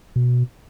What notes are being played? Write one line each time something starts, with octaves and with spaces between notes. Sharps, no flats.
B2